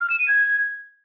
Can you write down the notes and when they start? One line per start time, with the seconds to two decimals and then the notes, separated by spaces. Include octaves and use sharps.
0.01 F6
0.10 E7
0.19 D#7
0.28 G#6